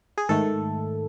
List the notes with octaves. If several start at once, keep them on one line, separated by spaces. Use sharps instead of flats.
G#4
G#2 D#3 A3 A4